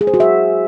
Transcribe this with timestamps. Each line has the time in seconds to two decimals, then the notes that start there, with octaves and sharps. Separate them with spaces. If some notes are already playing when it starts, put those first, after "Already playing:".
0.01 G#4
0.07 C5
0.14 F#4
0.20 E5